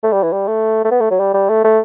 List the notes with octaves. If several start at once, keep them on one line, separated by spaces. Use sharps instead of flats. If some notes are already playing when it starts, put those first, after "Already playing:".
A3
G3
E3
G3
A3
A3
B3
A3
F#3
G3
G3
A3
A3